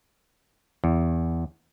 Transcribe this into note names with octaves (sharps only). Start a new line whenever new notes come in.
E2